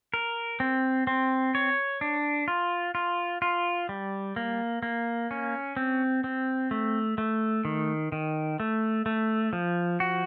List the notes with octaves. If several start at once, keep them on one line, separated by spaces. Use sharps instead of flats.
A#4
C4
C4
C#5
D4
F4
F4
F4
G3
A#3
A#3
C#4
C4
C4
A3
A3
D#3
D#3
A3
A3
F3
F#4